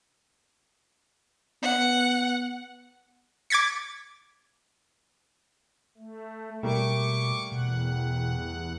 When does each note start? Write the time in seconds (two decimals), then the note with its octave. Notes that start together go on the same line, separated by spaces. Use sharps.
1.63 B3 F#5
3.50 D6 G#6 A6 B6 C#7
5.98 A3
6.63 B2 G3 A3 A#3 C#6 D6
7.52 E2 B2 F#5